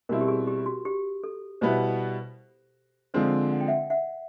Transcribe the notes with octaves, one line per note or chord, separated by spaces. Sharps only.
B2 G3 C4 E4 A#4
G4
G#4
G4
F#4
G4
A4
B2 G3 B3 E4 C5
D3 F3 G#3 C4 C5
F#5
G5
E5 F#5
E5 F#5